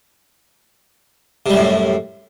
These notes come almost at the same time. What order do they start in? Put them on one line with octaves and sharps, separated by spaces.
C3 G3 F#2 A2